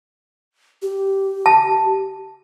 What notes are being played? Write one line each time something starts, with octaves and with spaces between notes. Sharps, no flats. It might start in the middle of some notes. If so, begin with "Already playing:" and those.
G4
A5